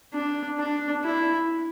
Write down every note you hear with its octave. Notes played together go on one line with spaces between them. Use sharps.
D4
D4
E4